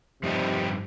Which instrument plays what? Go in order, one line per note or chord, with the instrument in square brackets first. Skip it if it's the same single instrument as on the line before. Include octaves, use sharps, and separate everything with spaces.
[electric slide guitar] G2 F3 D#4 G4 [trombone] C3